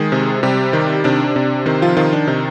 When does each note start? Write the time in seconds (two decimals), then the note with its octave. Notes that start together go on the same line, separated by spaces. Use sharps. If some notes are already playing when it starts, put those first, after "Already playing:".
Already playing: D#3 G#3 G#4
0.12 C3
0.43 C3 G3 G4
0.73 D#3
1.04 C3 D4 D5
1.36 C3
1.66 D#3 C4 C5
1.82 F3 F4
1.97 D#3 F3 F4
2.13 D4
2.27 C3 D#4